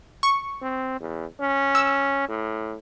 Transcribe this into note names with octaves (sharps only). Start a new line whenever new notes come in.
C#6
C4
E2
C#4
E6
A2